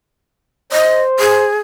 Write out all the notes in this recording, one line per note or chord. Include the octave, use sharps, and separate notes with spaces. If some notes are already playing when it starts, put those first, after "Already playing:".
C5 D#5
G#4